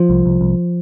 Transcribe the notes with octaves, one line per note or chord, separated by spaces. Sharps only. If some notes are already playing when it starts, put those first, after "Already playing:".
Already playing: F3
C2
C2
C2